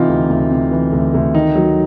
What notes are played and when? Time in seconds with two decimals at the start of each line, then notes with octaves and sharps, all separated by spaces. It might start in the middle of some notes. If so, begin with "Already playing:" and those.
Already playing: C3 E3 D#4 F4
0.09 D2
0.30 D2
0.50 C3
0.72 E3
0.93 D2
1.14 D2
1.34 D#3 D#4
1.55 F#3